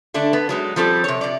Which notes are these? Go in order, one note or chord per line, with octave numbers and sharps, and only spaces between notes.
D3 A3 D4
B3
F#3 G#3 D#4
F3 G3 C4 A4
C3 C#5
C3 D5